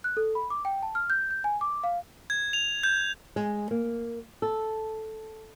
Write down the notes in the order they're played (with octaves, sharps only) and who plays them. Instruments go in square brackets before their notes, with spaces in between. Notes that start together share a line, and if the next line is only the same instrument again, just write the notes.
[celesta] F#6
A4
B5
D6
G5
A5
F6
G6
G6
G#5
D6
F5
[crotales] G#6
F7
G6
[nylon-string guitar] G#3
A#3
A4